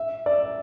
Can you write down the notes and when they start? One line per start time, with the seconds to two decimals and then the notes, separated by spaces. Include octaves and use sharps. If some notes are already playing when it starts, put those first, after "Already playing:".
Already playing: E5
0.26 D5